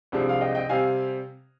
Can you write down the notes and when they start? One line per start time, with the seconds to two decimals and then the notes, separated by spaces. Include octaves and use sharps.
0.12 C2 C3 F3 G#3 D4
0.29 F5
0.41 D#5 G5
0.55 D#5 G5
0.69 C3 G3 C4 F5 G#5